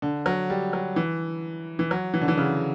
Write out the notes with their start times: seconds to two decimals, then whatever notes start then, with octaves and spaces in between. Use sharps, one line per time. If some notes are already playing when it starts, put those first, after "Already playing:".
0.02 D3
0.26 F#3
0.50 G3
0.73 F#3
0.96 E3
1.79 E3
1.91 F#3
2.14 E3
2.21 D3
2.28 E3
2.37 C#3